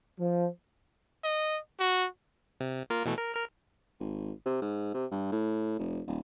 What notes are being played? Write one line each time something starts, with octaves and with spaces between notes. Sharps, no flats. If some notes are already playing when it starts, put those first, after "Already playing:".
F3
D#5
F#4
C3
A#3 F4 A#4
B2 E3 A3
A#4
A#4 F6
G#1
C3
G#2
C3
G2
A2
F1
D#1